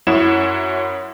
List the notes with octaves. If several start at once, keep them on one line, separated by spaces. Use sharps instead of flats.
F#2 E4 C#5 F#5 E7